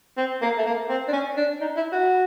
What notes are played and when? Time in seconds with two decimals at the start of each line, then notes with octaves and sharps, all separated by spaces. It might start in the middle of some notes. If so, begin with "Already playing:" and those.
0.17 C4
0.42 A#3
0.58 A3
0.66 A#3
0.89 C4
1.08 D4
1.13 C#4
1.37 D4
1.61 D#4
1.76 E4
1.92 F#4